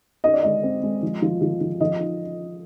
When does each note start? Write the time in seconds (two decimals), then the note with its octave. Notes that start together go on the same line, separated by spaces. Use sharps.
0.24 D#4 D#5
0.34 D5
0.43 G#3 D#5
0.63 C4
0.83 G#3
1.03 F3
1.22 F3
1.42 F3
1.61 F3
1.81 F3 D#5
2.00 D#4